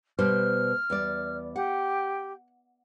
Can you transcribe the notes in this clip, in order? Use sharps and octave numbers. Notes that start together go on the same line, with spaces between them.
B2 G3 C5 F6
E2 G3 D5
G4 F#5